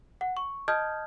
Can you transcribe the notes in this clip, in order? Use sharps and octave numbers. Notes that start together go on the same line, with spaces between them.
F#5
C#6
D#5 A5 D#6 F6 G6 G#6